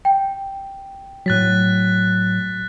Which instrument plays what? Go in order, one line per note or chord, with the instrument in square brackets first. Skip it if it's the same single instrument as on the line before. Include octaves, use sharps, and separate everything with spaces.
[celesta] G5
[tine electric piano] A2 F#3 [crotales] F#6 A6 B6